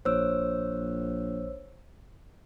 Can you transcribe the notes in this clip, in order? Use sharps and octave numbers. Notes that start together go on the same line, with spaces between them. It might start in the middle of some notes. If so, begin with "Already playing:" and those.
A#1 C5 C#5 E6